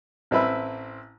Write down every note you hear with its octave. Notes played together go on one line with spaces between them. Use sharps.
A1 C4 E4 B4 E5